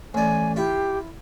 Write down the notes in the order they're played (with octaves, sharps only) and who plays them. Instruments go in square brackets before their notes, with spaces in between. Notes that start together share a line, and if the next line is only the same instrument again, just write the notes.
[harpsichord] A1 D5 [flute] G#5
[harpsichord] E4 F4 [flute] G4